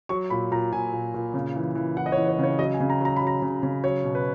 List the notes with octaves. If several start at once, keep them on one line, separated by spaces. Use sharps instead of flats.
F#3 C#6
A#2 B5
A#2 A#5
A#2 G#5
A#2
A#2
C#3
E3
E3
E3 F#5
D#5
C#5
E3
C#5
C#3 C#5
F#3 D#5
G#5
C#3
A#5
F#3 A#5
B5
F#3
A#5
C#3
C#3
F#3 C#5
B2
B4